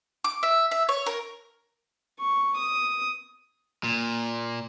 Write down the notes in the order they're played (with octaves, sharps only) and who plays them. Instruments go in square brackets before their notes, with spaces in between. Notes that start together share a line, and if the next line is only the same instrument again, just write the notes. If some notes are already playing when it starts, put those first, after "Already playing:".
[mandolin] D6
E5
E5
C#5
A#4
[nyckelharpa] C#6
D#6
[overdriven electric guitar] A#2